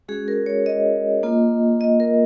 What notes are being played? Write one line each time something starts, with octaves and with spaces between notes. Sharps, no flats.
G#3 C#4 F#4 G#4
A#4
C#5
D#5
A#3 F4
D#5
A#4